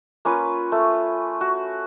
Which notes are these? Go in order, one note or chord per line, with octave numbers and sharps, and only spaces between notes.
A#3 C#4 F4 B4
A3
F#4